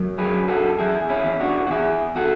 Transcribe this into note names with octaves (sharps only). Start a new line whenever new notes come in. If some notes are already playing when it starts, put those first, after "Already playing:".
Already playing: F#2 F#3
G#4 B4
F#2
F#4 A4
E2 E4 G#4
C#4 E4
E2
D4 F#4
F#4
E2 E4 G#4
F#4 A4